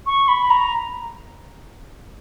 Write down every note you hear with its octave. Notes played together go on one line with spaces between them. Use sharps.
C#6
B5
A#5